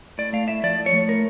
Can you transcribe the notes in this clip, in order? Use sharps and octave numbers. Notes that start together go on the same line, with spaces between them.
A2 D5
A3 F5
A2 E5
F3 D5
A2
C#5
A3
A2 A#4